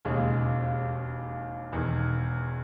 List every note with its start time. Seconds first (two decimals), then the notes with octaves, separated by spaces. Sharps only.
0.05 E1 D#2 C#3 G#3
1.72 E1 E2 D#3